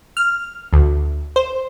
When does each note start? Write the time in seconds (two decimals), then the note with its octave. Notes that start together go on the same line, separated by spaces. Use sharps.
0.17 F6
0.73 D2
1.36 C5